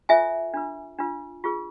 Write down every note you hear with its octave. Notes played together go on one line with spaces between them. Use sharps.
F4 A4 C5 E5 G#5
D4 F4 B4
D4 F4 B4
F4 G#4 B4